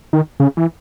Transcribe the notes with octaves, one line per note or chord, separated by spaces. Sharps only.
D#3
C#3
E3